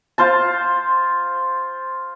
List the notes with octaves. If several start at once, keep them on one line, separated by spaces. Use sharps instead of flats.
F4 C5 A5